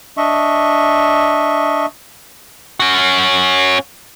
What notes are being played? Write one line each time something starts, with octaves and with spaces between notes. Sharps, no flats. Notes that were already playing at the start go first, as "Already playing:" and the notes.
D4 D#5 E5 C#6
C#4 F#4